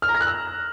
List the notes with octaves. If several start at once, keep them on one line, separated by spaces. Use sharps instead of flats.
F6
A#5
A#6
F#6
E6